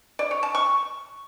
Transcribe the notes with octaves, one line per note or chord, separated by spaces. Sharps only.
D5
C#5
A5
C#6